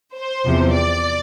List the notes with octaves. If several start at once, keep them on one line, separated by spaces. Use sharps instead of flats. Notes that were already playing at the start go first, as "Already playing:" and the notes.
C5
E2 C3 F3
D5